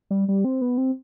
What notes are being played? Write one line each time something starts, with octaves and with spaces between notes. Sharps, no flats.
G3
G3
C4
B3
C4